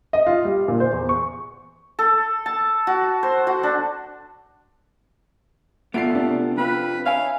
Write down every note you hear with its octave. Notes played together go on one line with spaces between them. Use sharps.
D#5
F4
G3
A#2
C5
E2
C#6
A4
A5
F#4
C5
F#4
D4
A3 B3 F4 D5 C7 D7
C3 D4
C4 F4 B4
C#5 E5 F5 G#5